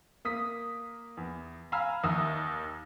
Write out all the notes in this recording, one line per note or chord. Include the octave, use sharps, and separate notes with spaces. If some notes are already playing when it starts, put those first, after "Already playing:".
A#3 D#6 B6
E2
F5 G#5 A#5 B5 E6 F6
D#2 E5 D#6 E6